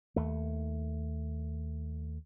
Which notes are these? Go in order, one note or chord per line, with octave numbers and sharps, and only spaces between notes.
D#2 A3